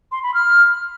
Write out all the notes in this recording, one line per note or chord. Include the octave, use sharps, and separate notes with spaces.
C6
B5
F6